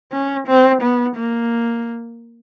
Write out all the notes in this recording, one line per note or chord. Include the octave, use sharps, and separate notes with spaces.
C#4
C4
B3
A#3